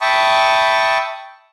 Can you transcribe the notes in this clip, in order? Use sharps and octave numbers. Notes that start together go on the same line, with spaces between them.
E5 G5 A5 B5 C#6 D#6